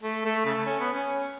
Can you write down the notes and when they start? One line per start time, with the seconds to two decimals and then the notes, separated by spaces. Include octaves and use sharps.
0.03 A3
0.25 A3
0.45 C#3 A3
0.66 C#4
0.80 B3
0.92 C#4